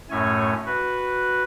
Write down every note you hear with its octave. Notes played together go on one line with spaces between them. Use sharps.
F#2 A2 A3 C#4 C#5 G#5
F#4 B4